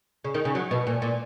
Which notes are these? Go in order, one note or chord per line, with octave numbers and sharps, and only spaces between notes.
C#3
D#3
C#3
F#3
B2
A#2
A#2